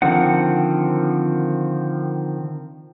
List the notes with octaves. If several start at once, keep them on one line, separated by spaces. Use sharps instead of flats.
D3 D#3 F3 C4 F#5